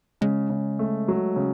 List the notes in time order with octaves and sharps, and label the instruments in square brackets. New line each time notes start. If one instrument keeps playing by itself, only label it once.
[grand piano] C#3 [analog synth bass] G#3
[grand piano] C#3
A3
F#3
C#3